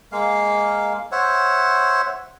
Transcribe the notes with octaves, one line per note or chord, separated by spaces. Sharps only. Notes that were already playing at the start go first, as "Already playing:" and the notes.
G#3 A#3 F5
C5 C#5 E5 F#5